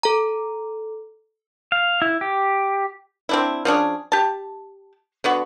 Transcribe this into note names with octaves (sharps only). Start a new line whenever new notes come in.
A4 A#5
F5
E4
G4
C4 D4 E4
F3 C#4 D4 G#4
G4 A5
D3 B3 F#4